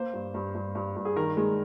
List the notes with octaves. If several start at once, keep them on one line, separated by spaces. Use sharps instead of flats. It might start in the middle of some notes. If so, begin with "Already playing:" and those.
Already playing: A#3 C5
G2
G2
G2
G2
G2
G#4
D#3 A#4
G#3